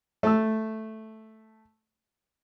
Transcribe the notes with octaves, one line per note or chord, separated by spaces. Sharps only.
A3 A5 E6